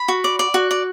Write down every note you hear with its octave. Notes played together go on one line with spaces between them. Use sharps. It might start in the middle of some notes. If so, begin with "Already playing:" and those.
Already playing: B5
F#4
D5
D5
F#4
D5